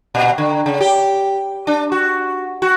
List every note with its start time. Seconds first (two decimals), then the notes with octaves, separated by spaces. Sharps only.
0.15 A#2
0.38 D3
0.66 C#3
0.80 G4
1.67 D4
1.92 F#4
2.62 F#4